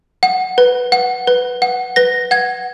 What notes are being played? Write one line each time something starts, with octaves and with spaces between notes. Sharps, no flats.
F#5
B4
F#5
B4
F#5
B4 A#6
F#5 G#6